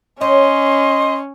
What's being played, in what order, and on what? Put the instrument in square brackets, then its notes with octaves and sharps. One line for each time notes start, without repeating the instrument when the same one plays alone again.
[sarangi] C#4 [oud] C#5 [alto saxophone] D#5 [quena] C6